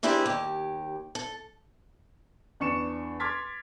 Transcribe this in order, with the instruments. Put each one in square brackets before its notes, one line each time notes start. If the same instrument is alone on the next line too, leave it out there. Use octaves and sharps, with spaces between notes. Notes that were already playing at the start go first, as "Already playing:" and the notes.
[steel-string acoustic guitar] A#3 D4 E4 G4 G#4 C5
D#2 G4
A4
[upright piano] E2 D4 C#6 C#7 E7
C6 D6 F6 G#6 A6 B6